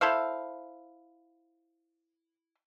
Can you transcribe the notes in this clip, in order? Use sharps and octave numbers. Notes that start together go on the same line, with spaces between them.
E4 A4 C5 F5